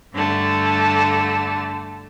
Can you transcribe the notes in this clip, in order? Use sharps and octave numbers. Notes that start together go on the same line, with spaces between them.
G2 D3 A3